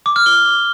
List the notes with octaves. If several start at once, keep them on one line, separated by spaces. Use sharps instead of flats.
D6
F6
G7